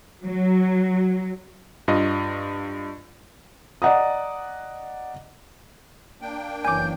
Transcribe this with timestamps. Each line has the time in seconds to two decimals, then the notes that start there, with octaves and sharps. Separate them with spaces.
0.23 F#3
1.88 G2 F4 D#5
3.82 D5 D#5 F#5 A#5 D#6
6.21 A#3 D4 G5
6.65 F#1 E3 C#4 G#5 D6 G6